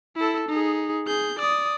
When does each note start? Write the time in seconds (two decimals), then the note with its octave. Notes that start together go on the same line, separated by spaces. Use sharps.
0.16 E4 A4
0.49 D#4 G#4
1.07 G#4 G6
1.39 D5 D#6